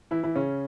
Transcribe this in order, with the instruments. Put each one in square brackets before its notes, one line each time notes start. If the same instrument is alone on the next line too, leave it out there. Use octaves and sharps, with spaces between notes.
[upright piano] E3 E4
E3 E4
C#3 C#4